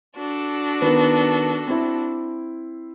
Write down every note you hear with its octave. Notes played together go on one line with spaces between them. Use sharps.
D4 F#4 A4
D#3 B3
C4 E4